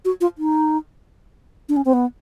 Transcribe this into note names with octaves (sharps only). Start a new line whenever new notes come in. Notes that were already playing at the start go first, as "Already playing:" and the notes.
F#4
F4
D#4
D4
C#4
C4
B3